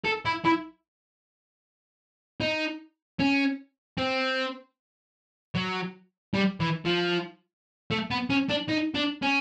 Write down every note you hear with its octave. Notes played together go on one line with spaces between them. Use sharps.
A4
E4
E4
D#4
C#4
C4
F#3
G3
E3
F3
A3
B3
C#4
D4
D#4
D4
C#4